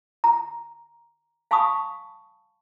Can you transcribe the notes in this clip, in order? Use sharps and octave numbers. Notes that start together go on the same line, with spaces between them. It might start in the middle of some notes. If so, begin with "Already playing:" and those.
A#5
F5 G#5 A5 B5 C#6 D#6